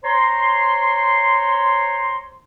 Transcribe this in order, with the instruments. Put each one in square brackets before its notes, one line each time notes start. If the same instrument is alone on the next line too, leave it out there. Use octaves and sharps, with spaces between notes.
[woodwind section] C5 C#5 A#5 C6